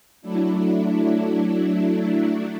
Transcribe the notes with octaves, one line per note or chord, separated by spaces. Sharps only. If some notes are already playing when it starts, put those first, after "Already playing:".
F#3 A3 D4 E4